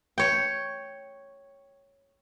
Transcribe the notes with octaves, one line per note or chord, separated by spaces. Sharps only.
C#5 G5